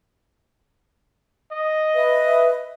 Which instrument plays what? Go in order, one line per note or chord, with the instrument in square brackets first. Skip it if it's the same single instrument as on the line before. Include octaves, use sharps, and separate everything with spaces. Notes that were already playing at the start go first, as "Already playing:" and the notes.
[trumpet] D#5
[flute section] B4 E5